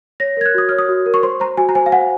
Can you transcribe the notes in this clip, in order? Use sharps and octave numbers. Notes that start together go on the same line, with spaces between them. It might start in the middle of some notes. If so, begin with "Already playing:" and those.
C#5 A#6
A#4 G#6
F#6
F#4 D#6
C#5 F6
D#6
F#4
A#4
C#6
C5 C6
C5 A#5
F#4 G#5
A#5
C5 G#5
F5
C5 F#5